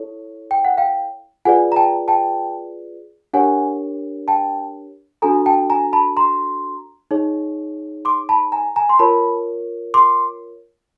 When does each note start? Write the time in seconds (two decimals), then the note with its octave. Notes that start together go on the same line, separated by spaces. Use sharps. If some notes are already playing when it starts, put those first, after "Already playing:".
Already playing: E4 A4 C#5
0.51 G5
0.65 F#5
0.77 F5 G5
1.45 F4 G#4 B4 D5 F#5 G#5
1.72 A#5
1.76 G5 A5
2.08 G5 A5
3.33 D4 G4 A#4 C#5 F#5 G#5
4.28 G5 A5
5.22 D4 F#4 A4 G#5 A#5
5.46 G5 A5
5.70 G#5 A#5
5.93 A5 B5
6.17 A#5 C6
7.11 D#4 G#4 C#5
8.05 C6 D6
8.29 A5 B5
8.52 G#5 A#5
8.76 G#5 A#5
8.89 C6
8.99 F4 A#4 C#5 A5 B5
9.94 C6 D6